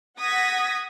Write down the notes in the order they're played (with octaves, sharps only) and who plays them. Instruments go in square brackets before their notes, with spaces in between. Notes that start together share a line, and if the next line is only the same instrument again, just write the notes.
[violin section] F#5 D#6 G#6 A#6 B6